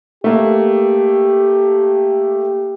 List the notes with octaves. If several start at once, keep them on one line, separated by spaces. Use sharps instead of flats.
A3 A#3 G4